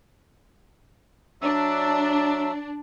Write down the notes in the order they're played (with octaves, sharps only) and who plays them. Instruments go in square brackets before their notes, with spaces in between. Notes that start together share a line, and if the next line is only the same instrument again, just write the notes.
[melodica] F#3 E5 E6 [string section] D4